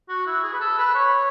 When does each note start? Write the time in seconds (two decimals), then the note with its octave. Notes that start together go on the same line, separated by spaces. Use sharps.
0.09 F#4
0.27 E4
0.43 G#4
0.53 B4
0.61 A4
0.78 B4
0.95 C#5